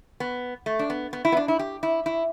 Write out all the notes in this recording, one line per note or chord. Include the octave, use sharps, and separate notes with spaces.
B3
A3
D4
B3
B3
E4
B3
D4
E4
G4
E4
E4